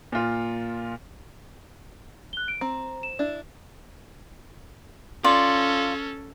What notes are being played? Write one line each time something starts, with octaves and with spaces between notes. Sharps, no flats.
A#2 F4
F#6 G7
D7
C4 A#5
E7
D4 E4
C#4 F4 A4 D5